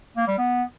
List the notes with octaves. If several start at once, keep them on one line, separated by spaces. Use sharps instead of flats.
A#3
G3
B3